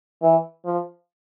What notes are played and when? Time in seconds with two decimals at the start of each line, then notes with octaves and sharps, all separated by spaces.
0.23 E3
0.65 F3